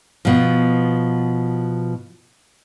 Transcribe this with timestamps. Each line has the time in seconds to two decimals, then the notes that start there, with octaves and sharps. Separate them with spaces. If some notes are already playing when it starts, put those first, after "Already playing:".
0.25 B2 F3